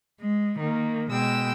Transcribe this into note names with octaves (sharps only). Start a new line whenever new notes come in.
G#3
D#3 A#3
B2 G#3 G5 E6